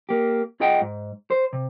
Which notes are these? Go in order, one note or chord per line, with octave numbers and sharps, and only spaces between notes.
A#3 G4
F4 G#4 D#5 F#5 G5
G#2
C5
C3